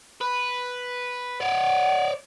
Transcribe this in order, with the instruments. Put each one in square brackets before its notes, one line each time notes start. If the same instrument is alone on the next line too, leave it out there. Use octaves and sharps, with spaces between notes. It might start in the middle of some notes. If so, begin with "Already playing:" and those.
[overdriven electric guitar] B4
[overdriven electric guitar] C#5 D5 [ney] F#5